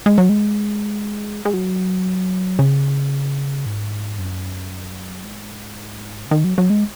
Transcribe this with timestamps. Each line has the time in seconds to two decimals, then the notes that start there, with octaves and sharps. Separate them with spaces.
0.06 G#3
0.18 F#3
0.29 G#3
1.45 G#3
1.53 F#3
2.59 C#3
3.66 G#2
4.18 F#2
5.24 G#2
6.26 C#3
6.31 D#3
6.44 F#3
6.58 F#3
6.70 G#3